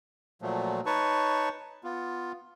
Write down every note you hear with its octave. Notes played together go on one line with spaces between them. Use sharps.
A#2 F3 F#3 A3
D#4 B4 C#5 A5 C#6
B3 F4